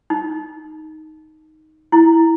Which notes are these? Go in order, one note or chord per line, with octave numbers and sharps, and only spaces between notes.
D#4
E4